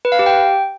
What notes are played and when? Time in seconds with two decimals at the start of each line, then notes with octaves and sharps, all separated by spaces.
0.05 B4
0.12 F5
0.19 G4
0.26 G5